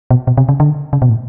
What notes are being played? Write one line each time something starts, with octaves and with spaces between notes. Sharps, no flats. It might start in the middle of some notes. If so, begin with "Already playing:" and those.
B2
B2
C3
C#3
D3
C#3
B2
A2